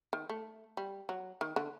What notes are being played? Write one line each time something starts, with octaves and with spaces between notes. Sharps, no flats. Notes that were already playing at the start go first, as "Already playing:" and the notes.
D#3
A3
G3
F#3
D#3
D3